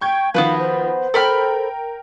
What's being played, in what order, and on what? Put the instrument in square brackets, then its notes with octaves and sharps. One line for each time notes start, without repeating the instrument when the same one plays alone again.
[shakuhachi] G5 [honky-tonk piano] C#6 G6 G#6
[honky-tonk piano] D#3 F3 [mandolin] B3 F#4 B4 [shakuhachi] F5
[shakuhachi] C5
[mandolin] A4 B5 F6 [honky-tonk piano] A#4 G5